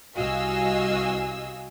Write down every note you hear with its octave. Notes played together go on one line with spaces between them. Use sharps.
C2 F#4 D#5 F5 G#5 E6